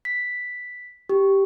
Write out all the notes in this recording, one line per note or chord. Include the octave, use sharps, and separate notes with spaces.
B6
G4